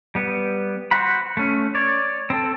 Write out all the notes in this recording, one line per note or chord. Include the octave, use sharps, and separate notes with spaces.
G3 B3
F#4 C5 F#5 B5
A3 C#4
C#5 D5
C4 A4